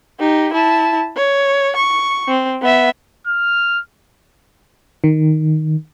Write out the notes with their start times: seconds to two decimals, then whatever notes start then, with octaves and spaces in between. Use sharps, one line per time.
0.19 D#4 G4
0.53 E4 A5
1.17 C#5
1.76 C#6
2.28 C4
2.62 B3 E5
3.27 F6
5.04 D#3